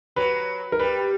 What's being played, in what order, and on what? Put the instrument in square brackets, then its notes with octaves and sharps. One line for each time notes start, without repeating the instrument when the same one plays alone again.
[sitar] F#3 [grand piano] B4
[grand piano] A#4
[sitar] G3 [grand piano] B4